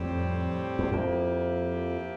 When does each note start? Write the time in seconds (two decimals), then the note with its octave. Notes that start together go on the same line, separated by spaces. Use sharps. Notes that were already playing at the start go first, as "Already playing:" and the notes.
Already playing: F2 A2 G3 C4 G4
0.79 E2
0.91 F2 F3 A#3 E4 G4